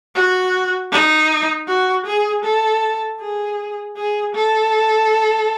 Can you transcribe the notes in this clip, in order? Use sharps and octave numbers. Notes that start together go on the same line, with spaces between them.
F#4
D#4
F#4
G#4
A4
G#4
G#4
A4